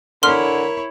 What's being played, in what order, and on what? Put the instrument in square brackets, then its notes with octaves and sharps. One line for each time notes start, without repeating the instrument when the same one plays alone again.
[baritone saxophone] D3 [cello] E4 C#5 [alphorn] A#4 [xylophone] C6 F6